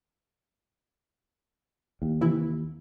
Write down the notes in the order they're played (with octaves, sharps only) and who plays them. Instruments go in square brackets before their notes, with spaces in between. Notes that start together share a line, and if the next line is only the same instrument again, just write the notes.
[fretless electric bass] D#2
[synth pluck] C3 E3 E4